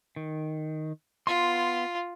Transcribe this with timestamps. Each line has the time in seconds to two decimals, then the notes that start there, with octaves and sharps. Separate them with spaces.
0.16 D#3
1.27 B3 F4 C6